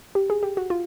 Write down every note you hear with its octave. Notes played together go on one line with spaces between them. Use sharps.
G4
G#4
G4
F#4
F4